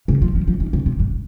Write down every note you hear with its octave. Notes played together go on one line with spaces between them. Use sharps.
C#3
F3
F3
F3
D#3
C#3
C3
G2